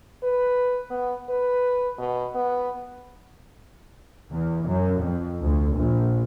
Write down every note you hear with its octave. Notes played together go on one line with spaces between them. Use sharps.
B4
B3
B4
B2
B3
E2
F#2
F2
D2
A#1